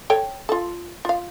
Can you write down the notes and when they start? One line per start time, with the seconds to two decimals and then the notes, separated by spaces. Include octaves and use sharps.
0.10 A4 C#5 G5
0.49 F4 A4
1.05 F4 F5